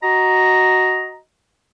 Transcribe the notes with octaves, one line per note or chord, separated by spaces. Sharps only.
F#4 D#5 A#5